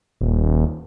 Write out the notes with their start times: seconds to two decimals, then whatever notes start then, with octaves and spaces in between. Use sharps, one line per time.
0.21 D#1